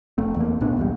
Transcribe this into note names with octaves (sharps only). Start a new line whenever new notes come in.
F1 A3 C4
E2 A#3
B1 A2 B3 D4
B1 E2 G3